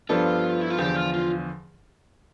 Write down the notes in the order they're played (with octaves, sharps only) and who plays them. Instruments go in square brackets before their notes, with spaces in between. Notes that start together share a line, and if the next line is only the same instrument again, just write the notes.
[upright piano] G2 F3 B3 D4 A4 [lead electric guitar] F4
[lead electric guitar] E4
F4
[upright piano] E2 D3 F3 [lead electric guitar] G4
[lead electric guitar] F4
F4